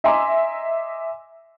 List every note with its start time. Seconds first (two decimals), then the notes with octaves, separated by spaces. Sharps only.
0.04 D#5 E5 G#5 A#5 C6 D6